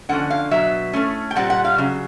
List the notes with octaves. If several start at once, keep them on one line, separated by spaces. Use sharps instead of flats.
D3 F3 A#3 C#4 F#5
F5
B2 F#3 B3 E5
A2 E3 A3 C#4
G5
A#2 G3 C4 F#5
F#5
F5
C#3 F#3